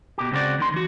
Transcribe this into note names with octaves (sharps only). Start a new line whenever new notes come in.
B2 G4
C#2 C#3 C4 C#4 F#4 D5
D#2 D#3 C6
E3 F#4